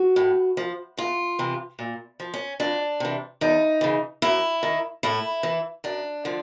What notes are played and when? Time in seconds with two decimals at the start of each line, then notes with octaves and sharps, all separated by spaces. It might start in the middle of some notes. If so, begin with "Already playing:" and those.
Already playing: F#4
0.16 A2
0.57 F3
0.97 E2 F4
1.39 C3 E3
1.79 A#2
2.20 F3
2.34 C#4
2.60 F2 D4
3.00 C3 E3
3.41 E2 D#4
3.81 C#3 E3
4.22 F#2 E4
4.63 D#3
5.03 A2 E4
5.43 E3
5.84 F#2 D4
6.25 D3 F3